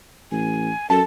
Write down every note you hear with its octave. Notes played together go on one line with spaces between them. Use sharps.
A1 G#5
F#2 A4 A5